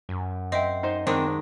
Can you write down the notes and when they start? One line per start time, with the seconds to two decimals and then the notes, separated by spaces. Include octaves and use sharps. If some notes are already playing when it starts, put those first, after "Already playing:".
0.09 F#2
0.52 C4 D#5 E5 G5
0.83 D#4 C5
1.07 D#3 G#3 C4 D4